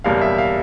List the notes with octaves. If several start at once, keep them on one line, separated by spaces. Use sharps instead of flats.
F#1 E2 B2 G3 F5
E5
F5